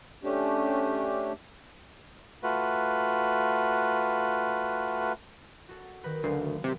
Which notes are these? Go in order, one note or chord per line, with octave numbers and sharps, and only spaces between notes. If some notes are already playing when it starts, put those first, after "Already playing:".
A3 C#4 D4 G4
A3 F4 F#4 B4
F#4 A4
D#3 A#4 B4
F#1 D2 A3 C7
C3